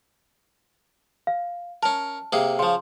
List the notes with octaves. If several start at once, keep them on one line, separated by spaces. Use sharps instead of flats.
F5
C#4 A#4 A5
C3 A#3 G#4
C#3 F3 C6